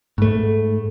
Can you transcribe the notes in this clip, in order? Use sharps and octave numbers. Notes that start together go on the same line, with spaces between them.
G#2 A3